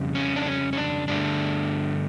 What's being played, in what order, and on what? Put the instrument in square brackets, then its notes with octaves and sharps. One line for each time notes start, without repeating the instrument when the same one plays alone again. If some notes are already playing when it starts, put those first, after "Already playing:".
Already playing: [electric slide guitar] F2 C#3 G3
C#4
D4
C#4
C#4
D4
G2 D3 A3 D4